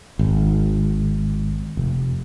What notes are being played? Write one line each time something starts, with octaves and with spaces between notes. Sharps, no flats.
G#1
F1